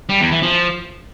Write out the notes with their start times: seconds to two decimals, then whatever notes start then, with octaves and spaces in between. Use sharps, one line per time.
0.09 G3
0.20 E2
0.32 E3
0.43 F3